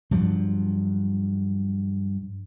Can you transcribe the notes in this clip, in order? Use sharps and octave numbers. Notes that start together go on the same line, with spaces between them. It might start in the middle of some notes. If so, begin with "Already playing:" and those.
G2 F3 F#3